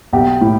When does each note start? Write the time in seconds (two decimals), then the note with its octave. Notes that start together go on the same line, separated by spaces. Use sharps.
0.13 B1 G4
0.41 A2